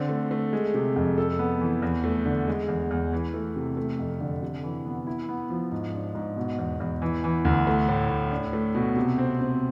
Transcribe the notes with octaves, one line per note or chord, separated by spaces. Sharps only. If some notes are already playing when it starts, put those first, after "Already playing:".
Already playing: D3 C4
A3
A3
G#3
C3
F2
A4
B3
E3
E2
A3
D3
G#3
E2
E2
E3
A3
C3
A3
F2
D3
C3
E3
B3
E4
B3
F3
G#2
D4
G#2
B2
E2
E2
E3
E3
D2
A3
A2
A2
D4
A3
B2
C3
C4
C4